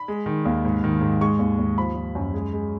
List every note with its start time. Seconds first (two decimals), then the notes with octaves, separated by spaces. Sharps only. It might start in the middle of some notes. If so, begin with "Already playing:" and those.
Already playing: B5
0.08 G#3
0.26 D#3
0.45 D#2
0.65 G#2
0.84 D#3
1.01 G#2
1.21 G#3 C#6
1.39 D#2
1.59 D#2
1.77 F3 B5
1.96 F3
2.15 F#2
2.34 G#3
2.53 G#3